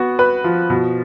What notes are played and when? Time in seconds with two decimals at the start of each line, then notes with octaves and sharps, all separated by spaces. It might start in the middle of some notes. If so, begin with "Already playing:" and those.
Already playing: B3 F#4
0.19 B4
0.44 F3
0.70 B2